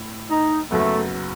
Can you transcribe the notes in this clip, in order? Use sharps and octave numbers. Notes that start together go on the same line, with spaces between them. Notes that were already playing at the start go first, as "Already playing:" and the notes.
Already playing: A2 E4
D#4
F#1 F#2 F#3 A3 B3